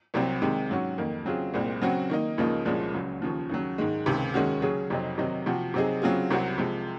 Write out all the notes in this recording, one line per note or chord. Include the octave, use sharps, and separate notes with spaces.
C2 C3 F#3 C4
C3 D#3 G#3 C4
G#2 F#3 C#4 F#4
F2 D#3 A#3
C#3 F#3 C4 F4 G#4
C2 A#2 G#3 C4
C#3 F#3 C4 F#4
D#3 A#3 D#4
C#2 C#3 F3 A#3 D#4
C2 A#2 F3 G#3 C#4
C#2 C#3 F#3
D#2 C#3 F3
D#2 C#3 F#3
G#2 D#3 G#3
C#2 C3 D#3
D#2 D#3 G#3 C#4 F#4
C#3 F#3 C#4 G#4
F2 C3 F#3 C4 D#4
C3 D#3 F#3 C4 D#4
C3 F3 C4 F#4
C3 F#3 C4 D#4 G#4
C#3 F#3 C4 F4 G#4
C2 C3 F#3 C4 F#4
C3 F3 G#3